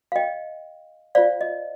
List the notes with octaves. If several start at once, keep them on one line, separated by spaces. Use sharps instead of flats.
F5
D#5 G5
F4 C5 D5 F5
D#5